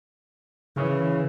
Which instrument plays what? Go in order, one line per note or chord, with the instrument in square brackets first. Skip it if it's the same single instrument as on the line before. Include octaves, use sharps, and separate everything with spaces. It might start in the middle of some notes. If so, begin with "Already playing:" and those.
[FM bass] C#3 [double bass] E3